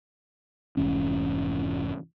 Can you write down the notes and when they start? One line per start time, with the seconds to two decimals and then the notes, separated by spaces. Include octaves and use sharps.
0.77 F1 G#2 E3 C#4